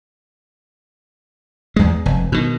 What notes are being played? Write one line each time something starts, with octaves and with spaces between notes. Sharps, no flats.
E2 G#3
F1
B2 D#3